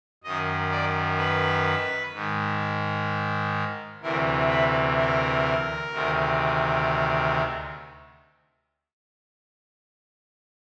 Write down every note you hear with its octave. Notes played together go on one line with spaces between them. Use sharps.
F#2 D#3 D#5
D5
B4
G#2 D#3
D2 C3 E3 A#4
B4
A#4
D2 C3 D#3